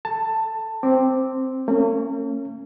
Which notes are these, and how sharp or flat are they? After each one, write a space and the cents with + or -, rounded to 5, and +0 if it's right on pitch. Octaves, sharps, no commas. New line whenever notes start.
A4 +0 A5 +15
C4 +0 D6 +0
A#3 -45 C#4 -15